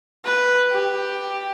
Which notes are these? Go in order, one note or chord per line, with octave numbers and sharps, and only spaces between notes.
B4
G4